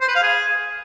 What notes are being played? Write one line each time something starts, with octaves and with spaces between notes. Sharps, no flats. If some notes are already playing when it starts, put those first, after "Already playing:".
C5
B4
F5
G#4